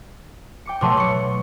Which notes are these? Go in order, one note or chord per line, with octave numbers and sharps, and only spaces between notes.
G5 D6 C#7
B2 F#3 A3 A5 C6 D6
C#6 C#7